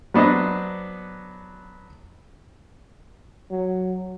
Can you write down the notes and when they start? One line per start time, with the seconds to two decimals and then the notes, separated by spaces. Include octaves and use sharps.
0.14 F#3 B3 D4 C5 D#5
3.51 F#3